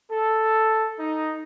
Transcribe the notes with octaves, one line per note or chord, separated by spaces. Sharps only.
A4
D#4